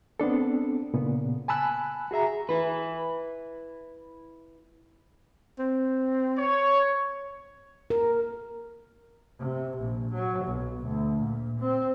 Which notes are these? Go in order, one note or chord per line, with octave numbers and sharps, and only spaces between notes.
B3 C4 D4 A4
A#2 C#3 B3
G#5 A5 B5 E6 F#6
F#4 G#4 E5 A#5
E4 B4
C4
C#5
A#4
C3
A#1
F#3
B1
D2
A#2
C4